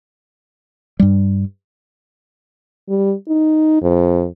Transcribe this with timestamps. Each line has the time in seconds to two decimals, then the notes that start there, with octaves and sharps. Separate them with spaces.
0.99 G2 G3
2.89 G3
3.29 D#4
3.82 F2